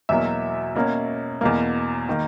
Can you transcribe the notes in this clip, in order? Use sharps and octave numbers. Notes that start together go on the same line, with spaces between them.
E2 B2 F#3 A#3 E5
B2 A#3 C#4
E2 B2 A#3
D#3 A#3